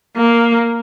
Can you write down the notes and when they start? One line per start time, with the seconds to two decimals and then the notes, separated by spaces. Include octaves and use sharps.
0.16 A#3